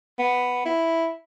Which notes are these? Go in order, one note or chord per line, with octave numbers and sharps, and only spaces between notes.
B3
E4